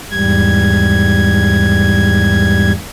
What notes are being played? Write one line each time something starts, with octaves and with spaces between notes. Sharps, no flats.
E2 G#2 G3 G#6